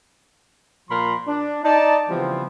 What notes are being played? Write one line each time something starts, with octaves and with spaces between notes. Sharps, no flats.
A#2 F3 A#4 B5 C6
D4
D#4 D5 A5
C#3 E3 F3 G3 B3 C4